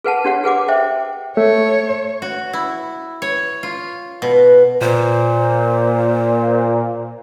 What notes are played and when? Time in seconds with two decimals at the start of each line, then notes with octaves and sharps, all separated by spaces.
0.04 G#4 B4 F#5 A5
0.25 D4 G4 C#5 F#5
0.44 G#4 B4 F#5 D6
0.68 C5 E5 G5
1.37 A3 C#5
2.22 F#4
2.53 E4
3.22 C#5
3.63 F4
4.22 B2
4.81 A#2 C5